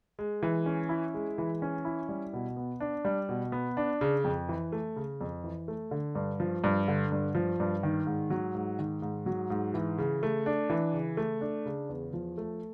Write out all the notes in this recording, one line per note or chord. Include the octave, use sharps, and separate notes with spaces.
G#3
E3
C#4
E4
G#3
E3
C#4
E4
G3
B2
B3
D4
G3
B2
B3
D4
C#3
F2
E3
A3
C#3
F2
E3
A3
D3
G2
F3
G2
D3
G2
F3
G2
D#3
G#2
F#3
G#2
D#3
G#2
F#3
G#2
E3
C#3
A3
D4
E3
C#3
A3
D4
C#3
E2
F3
A3